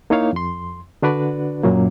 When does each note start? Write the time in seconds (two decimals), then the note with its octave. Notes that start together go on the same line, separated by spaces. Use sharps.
0.10 A#3 D#4 E4 C#5 F5
0.33 F2 C6
1.02 D3 D4 F#4 B4 D5
1.64 F#2 A#2 F#3 A#3